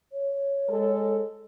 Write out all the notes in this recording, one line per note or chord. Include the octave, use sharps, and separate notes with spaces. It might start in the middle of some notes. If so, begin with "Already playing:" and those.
C#5
G#3 A4